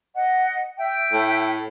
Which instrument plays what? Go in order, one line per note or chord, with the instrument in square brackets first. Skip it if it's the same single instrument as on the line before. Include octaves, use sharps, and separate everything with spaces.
[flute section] D#5 F#5
E5 G5
[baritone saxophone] A2